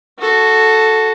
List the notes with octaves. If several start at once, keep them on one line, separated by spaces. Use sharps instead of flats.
F#4 A4